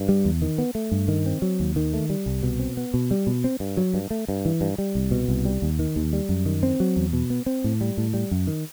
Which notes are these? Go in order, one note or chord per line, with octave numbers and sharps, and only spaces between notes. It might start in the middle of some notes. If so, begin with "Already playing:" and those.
Already playing: G2
G3
E2
D#3
B3
A3
G2
D#3
C4
F#3
D#2
D#3
A3
G3
C2
B2
C4
B3
B2
G3
B2
C4
G2
F#3
G2
A3
G2
E3
G2
G3
C2
B2
C2
G3
D#2
D#3
D#2
G3
F#2
D#3
C4
F#3
E2
B2
B3
C4
A2
G3
A2
G3
F#2
D#3